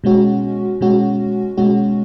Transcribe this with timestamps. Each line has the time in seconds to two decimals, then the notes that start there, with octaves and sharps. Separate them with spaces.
0.04 B2 G#3 C#4 F#4
0.81 B2 G#3 C#4 F#4
1.57 B2 G#3 C#4 F#4